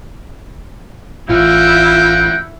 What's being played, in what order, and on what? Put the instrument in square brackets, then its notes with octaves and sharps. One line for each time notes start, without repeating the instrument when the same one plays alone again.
[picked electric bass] A1 [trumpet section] A#3 F#5 G5 [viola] E4 [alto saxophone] F4